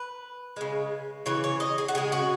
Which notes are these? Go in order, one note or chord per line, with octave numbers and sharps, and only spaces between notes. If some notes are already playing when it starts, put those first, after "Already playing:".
Already playing: B4
C#3 G#3
C#3 E3 C#5
C#5
D#5
G#4
F#4
C#3 G#3 G#4
F#4